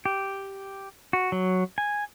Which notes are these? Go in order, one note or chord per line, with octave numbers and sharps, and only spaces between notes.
G4
F#4
F#3
G#5